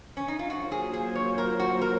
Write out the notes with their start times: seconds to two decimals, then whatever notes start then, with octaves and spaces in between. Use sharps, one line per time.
0.17 C#4
0.28 D#4
0.39 F4
0.50 F#3 A#3 F4 F#4 C5
0.72 G#4
0.93 G#4
1.15 C#5
1.38 A#4
1.60 F#4
1.81 A#4